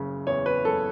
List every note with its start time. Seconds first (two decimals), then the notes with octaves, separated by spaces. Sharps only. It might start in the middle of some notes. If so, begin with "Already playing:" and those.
Already playing: F#1 C#3
0.27 E2 C#5
0.46 B4
0.65 F#1 A4